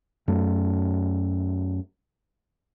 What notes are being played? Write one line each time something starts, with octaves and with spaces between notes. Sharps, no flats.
F#2 A3